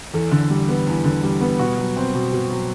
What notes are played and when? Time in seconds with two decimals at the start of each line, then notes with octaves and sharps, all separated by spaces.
0.14 E2 A4
0.31 D3
0.50 G3
0.69 B3
0.87 E2
1.04 D3
1.23 G3
1.41 B3
1.59 B2 F#4
1.78 F#3
1.97 C4
2.14 B2
2.33 B2
2.50 F#3